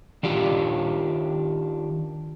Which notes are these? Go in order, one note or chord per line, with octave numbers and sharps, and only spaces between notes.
D#3 D4 F4 G4